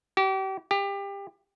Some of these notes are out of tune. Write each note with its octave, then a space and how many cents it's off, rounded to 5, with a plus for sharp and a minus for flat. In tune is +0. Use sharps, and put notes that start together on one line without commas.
G4 -35
G4 +25